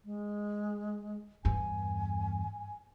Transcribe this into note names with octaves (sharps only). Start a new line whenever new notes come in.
G#3
E2 G2 G#5